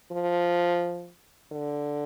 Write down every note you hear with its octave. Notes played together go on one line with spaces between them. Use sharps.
F3
D3